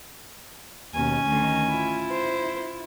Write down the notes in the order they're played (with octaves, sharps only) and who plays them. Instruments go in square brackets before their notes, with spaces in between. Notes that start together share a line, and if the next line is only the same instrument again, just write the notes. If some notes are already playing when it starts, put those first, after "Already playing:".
[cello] D#2 B2 [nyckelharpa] C#4 G#5
[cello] D2 D#3
E4 F4
[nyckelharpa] C5